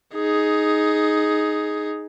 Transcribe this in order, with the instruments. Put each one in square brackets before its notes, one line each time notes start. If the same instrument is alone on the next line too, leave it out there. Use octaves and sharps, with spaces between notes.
[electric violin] D#4 G#4